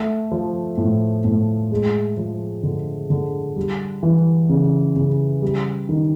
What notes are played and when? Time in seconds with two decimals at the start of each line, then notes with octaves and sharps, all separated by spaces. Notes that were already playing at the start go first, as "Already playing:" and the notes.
Already playing: A3
0.32 F3
0.77 A2
1.25 A2
1.72 G#3
2.17 F3
2.63 D3
3.10 D3
3.56 G3
4.03 E3
4.49 C#3
4.96 C#3
5.42 G3
5.89 D#3